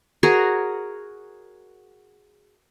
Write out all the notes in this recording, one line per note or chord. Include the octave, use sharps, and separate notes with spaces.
F#4 G#4 A#4 C#5